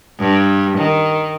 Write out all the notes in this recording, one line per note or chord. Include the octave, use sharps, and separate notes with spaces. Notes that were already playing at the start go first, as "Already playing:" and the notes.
G2
D#3